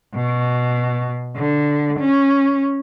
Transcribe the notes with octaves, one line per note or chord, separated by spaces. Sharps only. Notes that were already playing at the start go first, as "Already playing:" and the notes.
B2
D3
C#4